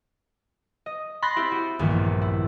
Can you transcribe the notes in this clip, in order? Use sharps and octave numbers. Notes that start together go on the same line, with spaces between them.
D#5
B5 C6 F#6 A6 A#6
C4 E4 G4
F#4
A#1 E2 G2 D#3
E4